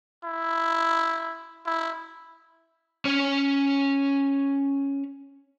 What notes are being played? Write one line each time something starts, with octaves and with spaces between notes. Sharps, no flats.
E4
E4
C#4 C#5